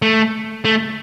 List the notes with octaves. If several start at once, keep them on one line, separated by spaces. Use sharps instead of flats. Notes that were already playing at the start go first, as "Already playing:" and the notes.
A3
A3